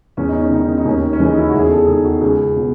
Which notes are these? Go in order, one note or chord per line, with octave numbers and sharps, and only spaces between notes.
E2 C#4
D#4
C#4
D#3 D#4
C#4
D#4
D#2 C#4
D#4
C#4
C#3 E3
D#4
E4
E2 F#4
G#4
A4
D#3 G#4
F#4
C#2 G#4
B2